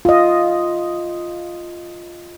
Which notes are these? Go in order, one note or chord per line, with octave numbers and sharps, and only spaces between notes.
F4 D#5